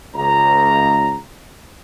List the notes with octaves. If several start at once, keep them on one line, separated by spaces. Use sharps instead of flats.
C#2 A#5